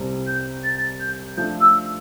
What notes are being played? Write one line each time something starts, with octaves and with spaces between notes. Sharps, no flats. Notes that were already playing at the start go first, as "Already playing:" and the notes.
Already playing: C2 C3 G3 C4
G6
A6
G6
F3 A3 D4 A4 G6
E6